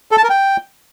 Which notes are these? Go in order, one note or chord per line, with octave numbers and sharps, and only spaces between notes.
A4
A5
A#4
G5